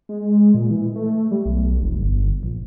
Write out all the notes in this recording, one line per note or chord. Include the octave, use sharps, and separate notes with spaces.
G#3
A#2
E3
A3
G3
B1
F1
G1
A#1